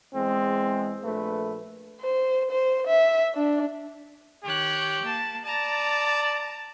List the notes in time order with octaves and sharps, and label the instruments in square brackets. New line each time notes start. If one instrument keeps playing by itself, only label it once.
[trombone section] E2 G#3 C4
A#1 A3 B4
[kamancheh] C5
C5
E5
D4
[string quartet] D#3 C#5 F#6 [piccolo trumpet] G4
[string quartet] A#3 A5
[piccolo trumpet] D5 [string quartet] A5 A#5